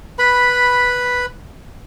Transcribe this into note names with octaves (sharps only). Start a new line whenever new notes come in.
B4 B5